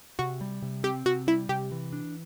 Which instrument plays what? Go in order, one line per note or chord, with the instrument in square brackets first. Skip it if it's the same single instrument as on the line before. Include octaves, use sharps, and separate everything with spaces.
[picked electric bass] C3 [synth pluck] F#4
[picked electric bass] G3
C3
[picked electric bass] C4 [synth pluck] G4
[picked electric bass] C3 [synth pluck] F#4
[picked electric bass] G3 [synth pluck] E4
[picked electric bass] C3 [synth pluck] G4
[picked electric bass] E3
D4